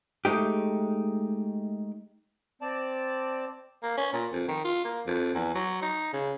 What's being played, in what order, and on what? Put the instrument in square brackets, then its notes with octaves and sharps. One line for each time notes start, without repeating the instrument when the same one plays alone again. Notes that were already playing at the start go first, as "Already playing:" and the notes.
[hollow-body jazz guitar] G#3 A3 D#4 G4
[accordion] C4 D5 A5
[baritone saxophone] A#3
C#4
A#2
F2
D#3
F4
A#3
F2
E2
F#3
D#4
C#3